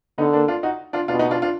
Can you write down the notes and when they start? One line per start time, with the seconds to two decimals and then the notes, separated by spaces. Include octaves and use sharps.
0.18 D3 B3 D#4
0.33 A#3 D4
0.48 D4 F4
0.63 D#4 F#4
0.93 D4 F4
1.08 B2 D4 F4
1.19 B3 D#4
1.31 D4 F4
1.42 D4 F4